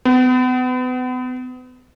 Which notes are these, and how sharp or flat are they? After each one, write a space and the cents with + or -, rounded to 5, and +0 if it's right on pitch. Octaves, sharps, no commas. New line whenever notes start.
B3 +35